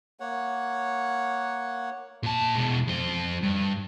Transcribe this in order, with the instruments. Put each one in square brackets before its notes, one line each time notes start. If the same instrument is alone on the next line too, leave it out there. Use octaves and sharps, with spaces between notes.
[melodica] A#3 C#5 F#5
[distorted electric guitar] A#2 A5
B2 G#3
F2 C5
G2